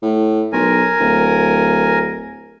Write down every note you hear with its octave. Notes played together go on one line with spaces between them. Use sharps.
A2
B1 A#4 G#5
D1